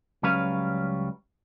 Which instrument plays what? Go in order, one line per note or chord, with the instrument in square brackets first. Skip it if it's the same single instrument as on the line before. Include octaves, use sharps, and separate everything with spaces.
[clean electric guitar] C#2 F#3 G3 C#4 B4 F5